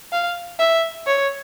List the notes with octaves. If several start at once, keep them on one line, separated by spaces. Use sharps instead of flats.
F5
E5
C#5